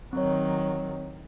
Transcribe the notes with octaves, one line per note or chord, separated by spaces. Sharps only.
D#3 F#3 C4 C#5